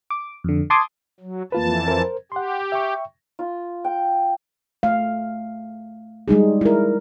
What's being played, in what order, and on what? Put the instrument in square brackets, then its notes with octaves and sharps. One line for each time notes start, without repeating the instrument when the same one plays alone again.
[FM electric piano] D6
F2 D3
A5 C6 D6 D#6 G#6
[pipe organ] F#3
[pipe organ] F2 E3 A5 [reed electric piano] A#3 F4 B4
[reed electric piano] A#4 C5
[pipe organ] G4 [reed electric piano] F#5 C6
[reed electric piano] E5 G5 C#6
[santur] F4
G5
[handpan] A3 F5
G3 G#3 D#4 G#4
E4 A#4